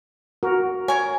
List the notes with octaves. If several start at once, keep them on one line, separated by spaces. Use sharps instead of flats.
F#4 A#4
A#4 C#5 G#5